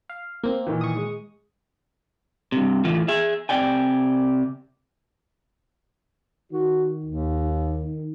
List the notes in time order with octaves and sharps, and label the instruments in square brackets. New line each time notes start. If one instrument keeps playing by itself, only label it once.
[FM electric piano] F5
A#3 C4
[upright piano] A#2 D#3 E3
[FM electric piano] C#6 D#6
[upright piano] G#3
[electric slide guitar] G2 C3
A2 E3 F4
G#4 E5
C3 D5 G5 G#5
[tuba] D#3 [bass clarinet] F#4
[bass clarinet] D#2